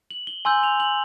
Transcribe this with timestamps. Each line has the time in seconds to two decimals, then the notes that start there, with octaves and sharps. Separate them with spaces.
0.11 F#7
0.27 G7
0.45 G#5 C6 E6 G6 F#7
0.63 F7
0.80 F#7